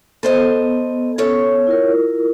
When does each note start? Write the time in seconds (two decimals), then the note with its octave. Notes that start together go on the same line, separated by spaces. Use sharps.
0.23 B3 A4 C5 D#5
1.18 C#4 A4 C#5
1.67 E4 F4 A#4